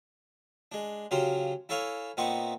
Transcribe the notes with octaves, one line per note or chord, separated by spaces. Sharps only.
G#3 D4
C#3 F#3 F4 G4 C5
E4 A4 C#5 F5 G#5
A#2 B3 C4 D#4 C5 C#6